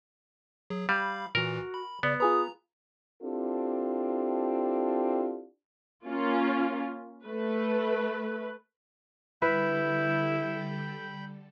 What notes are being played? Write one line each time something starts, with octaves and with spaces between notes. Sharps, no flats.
F#3 G#4
G3 F5 B5
A#2 E3 F#4 A#4
B5
C#3 B3 D5
F4 G#4 B4 A#5 D#6
C4 D4 E4 F4 G4 A4
A#3 C#4 F4
A3 B4
D3 G3 E4 A4 B4 G5 B5 G6